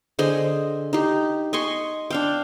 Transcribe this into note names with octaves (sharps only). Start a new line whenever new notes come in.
D3 G#4 C5 D#5
D#4 G4
D#5 G#5 C6 C#6
D4 F5 G5